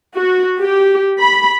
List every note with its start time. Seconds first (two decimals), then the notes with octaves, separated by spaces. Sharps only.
0.13 F#4
0.60 G4
1.20 B5